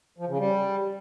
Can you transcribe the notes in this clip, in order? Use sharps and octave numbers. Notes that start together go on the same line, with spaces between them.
F3
C#3
G3